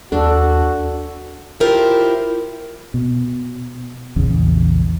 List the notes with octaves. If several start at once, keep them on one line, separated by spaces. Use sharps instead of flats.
D#2 D4 F#4 A4
E4 F4 G4 A#4 C5
B2
A#1 E2 C#3